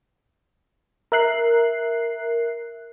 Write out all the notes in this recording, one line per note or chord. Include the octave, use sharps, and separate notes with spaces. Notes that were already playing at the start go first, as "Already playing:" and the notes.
A#4 E5 F#6 C7